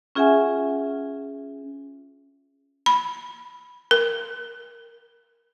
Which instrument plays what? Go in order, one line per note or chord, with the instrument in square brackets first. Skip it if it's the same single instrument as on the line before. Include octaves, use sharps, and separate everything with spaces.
[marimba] C#4 F4 G#4 E5 F#5 G#5
[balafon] B5
A#4